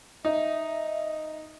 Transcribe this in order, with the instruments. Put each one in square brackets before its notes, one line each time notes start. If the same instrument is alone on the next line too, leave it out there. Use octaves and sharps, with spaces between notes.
[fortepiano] D#4 [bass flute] E5